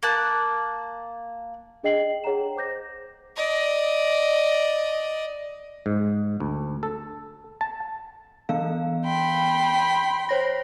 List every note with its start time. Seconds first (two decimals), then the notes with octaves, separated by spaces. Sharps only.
0.03 A#3 A5 F#6
1.83 D4 G#4 D#5 G5 C7 F#7
2.24 G#4 C#5 F#5 G5 A#5 E7
2.56 C5 D6 G6 A#6
3.36 D5 D#5
5.86 G#2
6.40 D2
6.83 A4
7.61 A5
8.49 E3 B3 F5
9.06 G5 B5 C6
10.29 C5 C#5 A#6